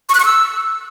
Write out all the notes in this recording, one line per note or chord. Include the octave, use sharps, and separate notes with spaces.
C#6
F#6
C#6
E6